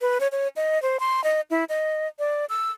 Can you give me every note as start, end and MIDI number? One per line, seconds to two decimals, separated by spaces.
0.01 0.18 71
0.20 0.28 73
0.32 0.48 73
0.56 0.81 75
0.82 1.00 72
1.00 1.23 84
1.24 1.41 75
1.50 1.64 64
1.69 2.08 75
2.19 2.46 74
2.49 2.71 88